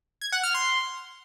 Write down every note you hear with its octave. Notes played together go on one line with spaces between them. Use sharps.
G#6
F#5
F6
C6